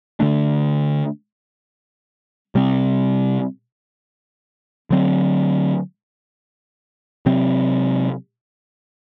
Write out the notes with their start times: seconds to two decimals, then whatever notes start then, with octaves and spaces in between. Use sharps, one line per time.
0.20 D3 A3 D4
2.55 C3 G3 C4
4.90 D3 F#3 C4
7.26 C3 F#3 C4